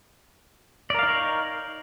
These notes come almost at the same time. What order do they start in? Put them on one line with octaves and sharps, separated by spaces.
D5 A#4 F5 D#4 C#5